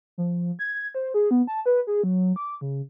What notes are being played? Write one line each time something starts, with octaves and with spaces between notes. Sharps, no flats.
F3
G#6
C5
G#4
B3
A5
B4
G#4
F#3
D6
C#3